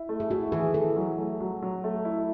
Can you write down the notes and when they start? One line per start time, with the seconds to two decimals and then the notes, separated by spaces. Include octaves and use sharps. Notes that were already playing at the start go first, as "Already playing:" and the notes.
Already playing: E4
0.09 A3
0.20 G#4
0.31 E4 F#4
0.52 E3 G#4
0.74 E3 A4
0.96 F#3
1.18 A3
1.40 F#3
1.62 F#3
1.84 A3
2.05 E4